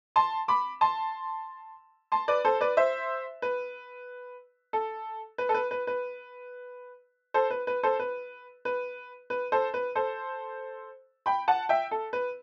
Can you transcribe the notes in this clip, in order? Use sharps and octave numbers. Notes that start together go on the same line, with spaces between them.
A5 C6
B5 D6
A5 C6
A5 C6
B4 D5
A4 C5
B4 D5
C5 E5
B4
A4
B4
A4
B4
B4
B4
A4 C5
B4
B4
A4 C5
B4
B4
B4
A4 C5
B4
A4 C5
G5 B5
F#5 A5
E5 G5
A4
B4